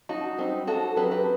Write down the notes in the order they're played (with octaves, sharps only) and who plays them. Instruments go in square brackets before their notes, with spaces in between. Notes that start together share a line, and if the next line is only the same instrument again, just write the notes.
[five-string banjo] D#4 F#4
G3 C4 D#4
F#4 A4
F#3 C4 D#4 G4 B4
G4 B4